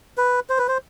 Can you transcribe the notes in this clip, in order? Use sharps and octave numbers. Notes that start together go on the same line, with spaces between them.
B4
C5
B4
C5